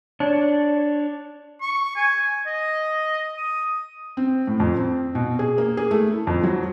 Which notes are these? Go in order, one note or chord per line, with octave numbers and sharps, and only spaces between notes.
D4 C#5
C#6
G#5
D#5
D#6
C4
A2
F2
C4
B2
G#4
A#3
G#4
A3
E4
F2
F#3